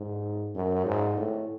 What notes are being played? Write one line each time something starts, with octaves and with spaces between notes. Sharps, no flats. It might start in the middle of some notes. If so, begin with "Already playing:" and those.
Already playing: G#2
F#2
G#2
A2